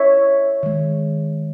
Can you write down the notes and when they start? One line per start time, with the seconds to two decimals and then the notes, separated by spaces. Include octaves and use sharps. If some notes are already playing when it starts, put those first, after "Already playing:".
Already playing: C#5 E5
0.63 D#3 G#3